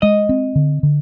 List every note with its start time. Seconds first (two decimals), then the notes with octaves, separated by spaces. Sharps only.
0.02 G#3 D#5
0.29 C4
0.56 D3
0.83 D3